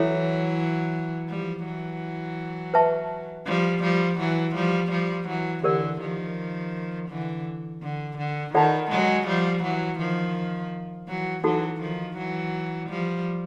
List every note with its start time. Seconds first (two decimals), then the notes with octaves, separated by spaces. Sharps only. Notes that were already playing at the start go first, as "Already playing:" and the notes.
Already playing: E3 F#3 E4 A4 C#5 E5
1.29 F3 G3
1.65 E3 F#3
2.74 B4 E5 A5 C#6
3.46 F3 G3
3.83 F3 G3
4.19 E3 F#3
4.55 F3 G3
4.91 F3 G3
5.28 E3 F#3
5.64 D3 E3 G4 A#4 D5
6.01 D#3 F3
7.09 D3 E3
7.82 D3
8.18 D3
8.54 D#3 F4 A4 D5 F#5 A5
8.91 F#3 G#3
9.27 F3 G3
9.63 E3 F#3
9.99 D#3 F3
11.08 E3 F#3
11.44 E3 F#3 D#4 F#4 A4
11.81 D#3 F3
12.17 E3 F#3
12.89 F3 G3